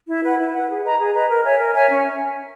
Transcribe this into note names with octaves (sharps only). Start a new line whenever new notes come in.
E4
B4 F#5
E4
B4 F#5
G#4
B4 D#5 A#5
G#4
B4 D#5 A#5
A#4
C#5 E5 G#5
A#4
C#5 E5 G#5
C#4